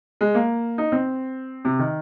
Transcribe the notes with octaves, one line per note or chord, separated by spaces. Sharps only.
G#3
A#3
D#4
C4
C3
D#3